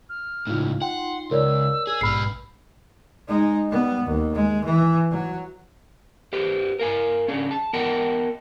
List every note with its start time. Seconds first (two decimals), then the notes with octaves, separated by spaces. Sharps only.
0.09 F6
0.47 C#2 A2 D#4 F4
0.82 F#5 G5 C6
1.31 C#2 A#4 C#5 D5 E6
1.87 G#4
2.01 A#1 G#2 B2 B4 B5 F6 C7
3.28 G#3 D#4
3.69 G3 B3
4.04 D#2
4.34 G#3
4.65 E3
5.11 F#3
6.33 G4 B4 C5
6.79 A#4 F5 G#5
7.28 C#4 D4 G#4
7.51 A5
7.73 B3 A#4 D#5 F#5 G5 A5